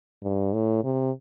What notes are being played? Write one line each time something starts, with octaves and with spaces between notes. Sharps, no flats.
G2
A2
C3